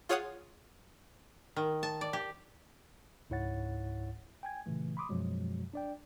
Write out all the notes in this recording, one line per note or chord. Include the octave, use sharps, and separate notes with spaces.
F4 G#4 C#5 F5 F#5 D#6
D#3
A5
D5
G4
C#2 G#2 E4 C#5 F#5 A6
G5 G#5 G#6
A#2 C#3 E3 A3
B5 C6 D6 D#6
F#2 B2 F3 F#3 G#3
D4 D5 G5